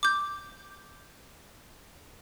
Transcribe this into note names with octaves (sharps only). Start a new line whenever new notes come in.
D6 G6